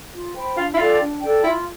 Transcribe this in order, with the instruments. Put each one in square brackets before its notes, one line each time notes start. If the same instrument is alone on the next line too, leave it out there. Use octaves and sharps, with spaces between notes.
[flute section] F4
C5 G5 B5
[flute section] D4 [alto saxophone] F4
[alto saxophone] E4
[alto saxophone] F4 [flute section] A4 D5 G5
[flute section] D4
A4 D5 G5
[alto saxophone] E4 [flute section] F4